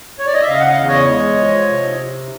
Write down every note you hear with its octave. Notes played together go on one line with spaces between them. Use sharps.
C#5
D5
D#5
E5
C#3 D#5 F5
F#5
D#5 F5
E2
C#5 D#5
G#3
F3
C3